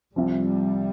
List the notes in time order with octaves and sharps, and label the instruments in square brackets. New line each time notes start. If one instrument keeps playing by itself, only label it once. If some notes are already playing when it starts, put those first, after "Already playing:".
[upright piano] C2 C3 F3 [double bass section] G3